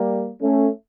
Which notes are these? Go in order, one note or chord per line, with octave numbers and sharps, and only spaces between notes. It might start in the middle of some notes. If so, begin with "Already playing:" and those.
Already playing: G3 A#3
A3 C#4